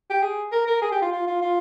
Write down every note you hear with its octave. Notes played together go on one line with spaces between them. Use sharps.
G4
G#4
A#4
A#4
G#4
G4
F4
F4
F4
F4